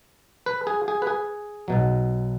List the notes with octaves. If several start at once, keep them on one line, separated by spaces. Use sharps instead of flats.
B4
G#4
G#4
B4
G#4
B1 B2 F#3